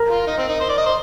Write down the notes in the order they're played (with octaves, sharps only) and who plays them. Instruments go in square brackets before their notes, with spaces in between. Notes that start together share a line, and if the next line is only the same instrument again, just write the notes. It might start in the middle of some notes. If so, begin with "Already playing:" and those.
Already playing: [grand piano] A#4 A#5
[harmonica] F4
D#4
C4
D#4
C5
D5
D#5
C5